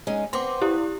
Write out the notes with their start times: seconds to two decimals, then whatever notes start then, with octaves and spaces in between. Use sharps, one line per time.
0.07 G#3 C#4 D#4
0.33 B3 C4 C6 D6
0.62 E4 G4